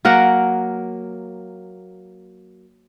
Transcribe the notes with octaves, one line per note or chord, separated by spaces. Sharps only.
F#3 A#3 A#4 F#5